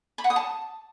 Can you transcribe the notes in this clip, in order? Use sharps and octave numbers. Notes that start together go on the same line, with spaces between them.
B5
F#5
D#6
A5